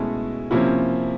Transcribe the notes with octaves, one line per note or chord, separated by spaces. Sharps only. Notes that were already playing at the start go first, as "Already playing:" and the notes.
Already playing: B2 G#3 A3 C#4 E4 A4
C3 F3 A#3 C#4 E4